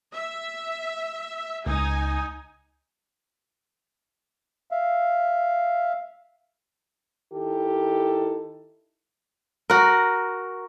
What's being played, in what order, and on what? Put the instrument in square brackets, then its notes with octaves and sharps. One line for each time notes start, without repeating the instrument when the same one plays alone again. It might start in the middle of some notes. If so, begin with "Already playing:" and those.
[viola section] E5
[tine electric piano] C#2 [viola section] D#4 G#5
[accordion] E5 F5
[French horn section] D#3 E4 G4 A4
[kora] F#4 A#4